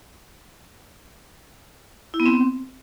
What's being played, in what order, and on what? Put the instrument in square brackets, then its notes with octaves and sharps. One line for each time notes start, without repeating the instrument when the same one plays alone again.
[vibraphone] E4
B3
C4